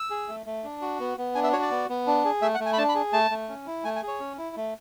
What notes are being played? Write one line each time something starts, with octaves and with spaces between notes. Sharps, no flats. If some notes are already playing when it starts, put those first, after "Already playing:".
Already playing: E6
G#4
A3
A3
D4
F#4
B3
B3
D4 G#5
E5
F#4 C#5
D5
B3
B3
D4
G#4
A3 E5
F#5
A3
G#5
B5
D4 A5
B5
G#4
A3 A5
A3
C#4
E4
A3 G#5
G#5
G#4
C#5
C#4
E4
A3